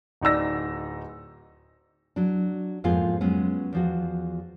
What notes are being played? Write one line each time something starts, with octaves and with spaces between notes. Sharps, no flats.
D1 D#4 D5 E6 A#6
F#3 D4
F2 G#2 A#3 B3 F4 G#4
F#3 G#3 B3 C#4
E2 F3 F#4